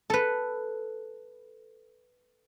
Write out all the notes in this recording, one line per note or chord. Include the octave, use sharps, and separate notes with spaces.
A4 B4